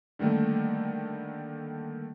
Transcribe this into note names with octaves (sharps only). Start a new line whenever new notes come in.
D3 D#3 G3 A3 A#3